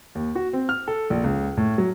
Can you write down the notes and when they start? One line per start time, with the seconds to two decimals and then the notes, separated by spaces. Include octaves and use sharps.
0.15 D#2
0.35 F#4
0.53 C4
0.69 F6
0.88 A4
1.10 A#1
1.24 C#2
1.57 A2
1.78 F#3